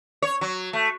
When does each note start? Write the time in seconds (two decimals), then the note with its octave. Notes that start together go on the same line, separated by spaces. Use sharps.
0.22 C#5
0.41 F#3
0.73 A3